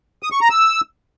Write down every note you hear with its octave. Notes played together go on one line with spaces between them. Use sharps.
D#6
C#6
A#5
E6